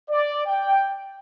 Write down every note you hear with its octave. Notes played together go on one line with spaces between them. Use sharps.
D5
G5